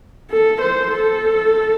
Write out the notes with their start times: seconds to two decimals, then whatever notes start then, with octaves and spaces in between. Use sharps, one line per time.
0.31 A4
0.61 C5
0.92 A4